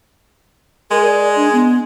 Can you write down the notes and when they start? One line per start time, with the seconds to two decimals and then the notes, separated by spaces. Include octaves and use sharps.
0.91 G#3 A#4
1.05 D5
1.36 D4
1.53 B3